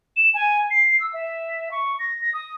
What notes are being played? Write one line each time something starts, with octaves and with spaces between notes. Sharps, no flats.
E7
G#5
C7
E6
E5
C#6
A#6
A#6
D#6